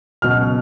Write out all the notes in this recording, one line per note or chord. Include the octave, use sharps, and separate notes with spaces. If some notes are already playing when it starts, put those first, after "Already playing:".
C#2 B2 F#3 F6